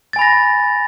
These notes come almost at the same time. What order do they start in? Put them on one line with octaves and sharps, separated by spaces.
A6 G#5 B5 A#6